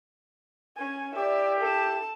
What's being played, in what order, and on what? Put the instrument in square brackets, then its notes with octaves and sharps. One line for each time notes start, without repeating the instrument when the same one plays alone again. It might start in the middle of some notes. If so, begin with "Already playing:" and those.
[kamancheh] C#4 G#5
[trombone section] E4 G4 [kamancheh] D5 E5
[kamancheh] A4 A5